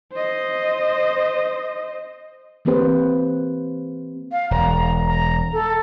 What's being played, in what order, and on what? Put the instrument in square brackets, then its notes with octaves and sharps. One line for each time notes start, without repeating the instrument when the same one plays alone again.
[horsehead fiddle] C5 D#5
[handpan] E3 A#3 C4 G4 B4 C5
[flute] F5
[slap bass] E1 [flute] A#5
[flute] A#5
A4